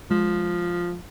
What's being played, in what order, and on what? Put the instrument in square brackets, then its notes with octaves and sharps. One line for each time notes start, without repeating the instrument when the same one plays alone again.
[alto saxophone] F3 [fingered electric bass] G#3